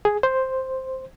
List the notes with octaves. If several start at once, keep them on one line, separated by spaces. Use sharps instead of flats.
G#4
C5